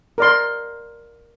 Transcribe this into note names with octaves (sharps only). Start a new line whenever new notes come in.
A#4 D5 C6